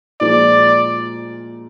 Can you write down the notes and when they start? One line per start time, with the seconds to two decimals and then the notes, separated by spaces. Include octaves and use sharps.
0.20 A#2 F3 G#3 D5